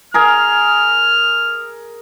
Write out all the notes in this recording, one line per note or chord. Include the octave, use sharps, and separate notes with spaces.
G#4 A#4 F6